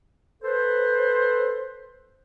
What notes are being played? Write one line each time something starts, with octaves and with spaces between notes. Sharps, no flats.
A4 B4 C5